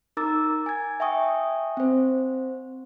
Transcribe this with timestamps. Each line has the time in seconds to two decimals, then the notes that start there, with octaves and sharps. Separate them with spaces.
0.17 D#4 A#4 A#5 D6 E6 A6
0.66 G#5 G#6
1.00 E5 G5 G#5 C#6 D#6
1.77 C4 C5